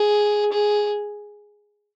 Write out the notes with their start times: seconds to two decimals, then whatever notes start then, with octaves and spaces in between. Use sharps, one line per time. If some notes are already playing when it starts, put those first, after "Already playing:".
Already playing: G#4
0.52 G#4